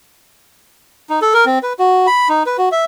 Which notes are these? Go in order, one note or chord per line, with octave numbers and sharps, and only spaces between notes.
D#4
A4
A#4
C4
B4
F#4
B5
D#4
B4
F#4
E5